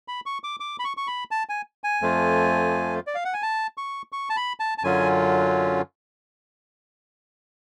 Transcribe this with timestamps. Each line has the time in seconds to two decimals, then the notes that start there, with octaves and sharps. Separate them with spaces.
0.08 B5
0.26 C#6
0.44 D6
0.60 D6
0.79 B5
0.85 C#6
0.97 C#6
1.07 B5
1.31 A5
1.49 G#5
1.84 G#5
2.01 F2 F3 A3 F4
3.07 D5
3.15 F5
3.25 F#5
3.34 G#5
3.42 A5
3.78 C#6
4.12 C#6
4.30 A5
4.36 B5
4.60 A5
4.78 A5
4.83 F#2 D3 F#3 C#4 F4 G#5